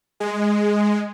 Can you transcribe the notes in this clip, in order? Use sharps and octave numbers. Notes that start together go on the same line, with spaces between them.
G#3